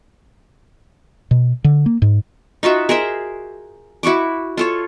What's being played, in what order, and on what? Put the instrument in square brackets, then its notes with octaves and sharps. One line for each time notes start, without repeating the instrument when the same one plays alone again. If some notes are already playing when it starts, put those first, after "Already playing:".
[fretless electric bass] B2
D3
A#3
G#2
[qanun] D#4 F4 F#4 E5
G#4 A#4 C5 E5
E4 F#4 C#6 D6
F4 A4 C#5